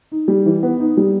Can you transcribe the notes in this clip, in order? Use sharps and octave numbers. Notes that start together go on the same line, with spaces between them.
D#4
G3
E3
B3
D#4
G3